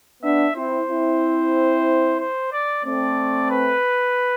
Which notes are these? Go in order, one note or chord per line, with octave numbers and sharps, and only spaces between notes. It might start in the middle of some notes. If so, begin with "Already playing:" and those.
B3 D4 E5
C4 E4 C5
C4 E4
C5
D5
A3 C4 D5
B4